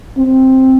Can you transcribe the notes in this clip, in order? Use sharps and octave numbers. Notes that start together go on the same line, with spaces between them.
C4